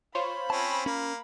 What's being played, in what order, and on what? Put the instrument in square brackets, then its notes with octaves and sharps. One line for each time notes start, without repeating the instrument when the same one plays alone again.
[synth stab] F4 C5 C#5 [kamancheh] B5
[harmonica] C4 C#4 [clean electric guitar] A5
[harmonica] A#3 [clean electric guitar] C#4 A#4